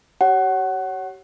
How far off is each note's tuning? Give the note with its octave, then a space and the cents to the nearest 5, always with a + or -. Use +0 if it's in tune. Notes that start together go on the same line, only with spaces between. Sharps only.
G4 -35 C#5 +0 F#5 +20